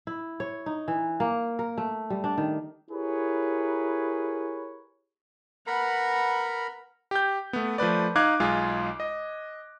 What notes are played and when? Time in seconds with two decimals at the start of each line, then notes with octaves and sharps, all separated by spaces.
0.07 E4
0.40 C#5
0.66 D#4
0.88 E3
1.20 A#3
1.59 A#4
1.78 A3
2.10 G3
2.24 D4
2.38 D#3
2.91 E4 G4 G#4 A#4 B4 C#5
5.67 A#4 B4 F#5 A#5 B5
7.11 G4 G6
7.53 A3 B3
7.78 F3 A3 B4 D5
8.16 D#4 F5 D6 F#6 G#6
8.40 B1 G#3 F4 G#4
9.00 D#5